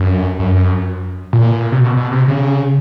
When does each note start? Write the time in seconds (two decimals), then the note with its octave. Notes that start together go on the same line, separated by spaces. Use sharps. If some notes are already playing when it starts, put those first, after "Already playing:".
Already playing: F#2
0.39 F#2
1.33 A#2
1.72 C3
1.80 B2
1.97 B2
2.11 C3
2.28 C#3